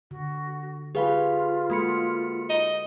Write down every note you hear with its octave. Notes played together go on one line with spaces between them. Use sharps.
D3 F#4
F4 G4 G#4 B4 F5 B5
G#3 A#3 F#4 A4 B5 C#7
D#5